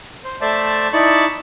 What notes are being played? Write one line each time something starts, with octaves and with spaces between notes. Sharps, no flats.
C5
A3 C5 D5 E5 A5
D#4 E4 D5 A5 B5 C#6